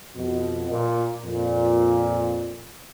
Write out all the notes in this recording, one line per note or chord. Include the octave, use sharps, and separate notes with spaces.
F2 B2
A#2
F2 A#2